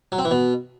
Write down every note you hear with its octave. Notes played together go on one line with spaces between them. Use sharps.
F#3
C4
E3
B2